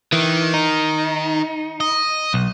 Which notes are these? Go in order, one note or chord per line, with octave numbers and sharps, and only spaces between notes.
D#3 E3
D#4
D#5
B1